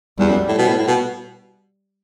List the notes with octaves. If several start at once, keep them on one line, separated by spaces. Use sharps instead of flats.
E2 G3
F#2
A2
B2
A2
A2
B2